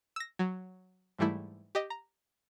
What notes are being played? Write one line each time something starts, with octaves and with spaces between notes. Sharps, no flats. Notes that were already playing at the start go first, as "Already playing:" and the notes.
E6 A#6
F#3
G#2 E3 G3 A3 E4
G4 D#5
A#5